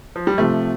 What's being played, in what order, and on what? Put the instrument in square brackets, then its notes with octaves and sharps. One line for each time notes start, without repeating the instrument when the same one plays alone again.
[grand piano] F3
G3
[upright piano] C3 F3 C4 G4 [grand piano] A3